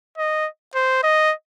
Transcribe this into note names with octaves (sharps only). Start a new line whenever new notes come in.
D#5
C5
D#5